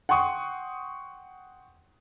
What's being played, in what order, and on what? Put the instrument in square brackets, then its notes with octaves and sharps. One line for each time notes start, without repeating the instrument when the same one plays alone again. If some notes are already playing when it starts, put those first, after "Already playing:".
[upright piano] F#5 G5 C6 C#6 D#6